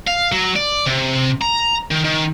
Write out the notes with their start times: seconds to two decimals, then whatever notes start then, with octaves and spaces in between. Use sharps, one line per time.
0.08 F5
0.32 F#3
0.56 D5
0.87 C3
1.42 A#5
1.91 D#3
2.04 D#3